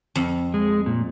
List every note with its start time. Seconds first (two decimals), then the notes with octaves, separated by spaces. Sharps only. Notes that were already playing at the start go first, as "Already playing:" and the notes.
0.15 F2
0.54 G#3
0.86 A#2